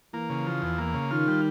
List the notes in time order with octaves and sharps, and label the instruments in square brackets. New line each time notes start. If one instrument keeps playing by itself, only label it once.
[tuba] E3 [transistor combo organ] A#3
[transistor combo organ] C#3
F3
E2
A#3
C#3
[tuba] D#3 [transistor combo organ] F4
[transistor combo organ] G3